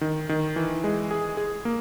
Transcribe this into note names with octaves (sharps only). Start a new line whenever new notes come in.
D#3
D#3
E3
G#3
G#4
G#4
A#3